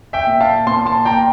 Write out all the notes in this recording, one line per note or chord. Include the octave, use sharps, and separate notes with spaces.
E5 G5
A#2
F5 A5
A#2 A5 C6
A5 C6
A#2 G5 A#5